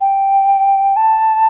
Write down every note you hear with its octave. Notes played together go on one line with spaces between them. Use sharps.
G5
A5